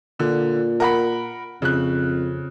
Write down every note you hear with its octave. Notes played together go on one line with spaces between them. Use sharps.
A#2 D3
A#4 F#5 B5
F2 C#3 F#6